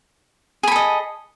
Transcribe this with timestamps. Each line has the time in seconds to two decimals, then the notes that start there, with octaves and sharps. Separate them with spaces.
0.63 G#4
0.67 B5
0.72 A4
0.76 D#5